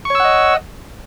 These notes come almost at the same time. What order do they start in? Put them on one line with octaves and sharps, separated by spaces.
C#6 C#5 E6 F#5 D#5